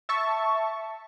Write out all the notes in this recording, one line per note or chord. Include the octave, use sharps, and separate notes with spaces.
E5 A5 C#6